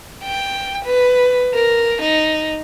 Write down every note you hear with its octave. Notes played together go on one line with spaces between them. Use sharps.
G5
B4
A#4
D#4